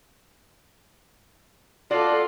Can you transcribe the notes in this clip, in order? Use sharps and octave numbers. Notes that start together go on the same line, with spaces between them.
F4 F#4 A4 D5